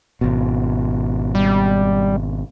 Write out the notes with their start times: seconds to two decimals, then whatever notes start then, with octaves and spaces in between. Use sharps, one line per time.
0.21 G#1 B2
1.35 G3